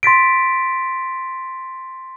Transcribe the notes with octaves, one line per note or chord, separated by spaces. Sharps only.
C6 A6 B6 D7